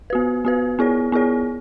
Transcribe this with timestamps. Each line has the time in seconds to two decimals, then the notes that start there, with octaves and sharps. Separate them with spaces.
0.10 B3 F#4 B4
0.45 B3 F#4 B4
0.79 B3 E4 G#4 C#5
1.12 B3 E4 G#4 C#5